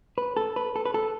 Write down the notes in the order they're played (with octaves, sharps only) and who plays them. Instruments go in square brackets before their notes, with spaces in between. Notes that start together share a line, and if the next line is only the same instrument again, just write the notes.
[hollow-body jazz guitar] B4
A4
B4
A4
B4
A4